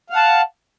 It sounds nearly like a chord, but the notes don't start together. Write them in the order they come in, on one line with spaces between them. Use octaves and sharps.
F5 F#5 A5